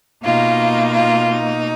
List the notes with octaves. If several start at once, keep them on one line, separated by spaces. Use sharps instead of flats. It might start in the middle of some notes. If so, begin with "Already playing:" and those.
B2 A#3 D#4 F4
F4
D#4